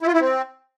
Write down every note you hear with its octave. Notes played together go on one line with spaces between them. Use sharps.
E4
F4
E4
C4